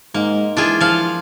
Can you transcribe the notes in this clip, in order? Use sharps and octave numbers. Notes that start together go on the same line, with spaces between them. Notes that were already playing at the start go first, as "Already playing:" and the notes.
G#2 A#3
E3 D4 F4 G#4
F3 F5